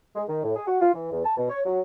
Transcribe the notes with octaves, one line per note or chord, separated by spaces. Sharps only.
G#3
D#3
A2
G#4
F#4
F4
E3
E2
A5
B2
C#5
F#3